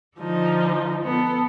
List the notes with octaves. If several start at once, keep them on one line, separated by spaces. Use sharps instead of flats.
D3 F3 D#4
B3 A4